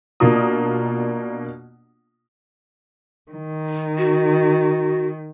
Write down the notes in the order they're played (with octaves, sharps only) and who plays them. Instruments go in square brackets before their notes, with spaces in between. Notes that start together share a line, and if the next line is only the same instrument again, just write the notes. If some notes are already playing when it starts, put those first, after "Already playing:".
[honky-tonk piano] B2 A#3 D4 F4 A#5 D#6
[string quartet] D#3
[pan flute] F#4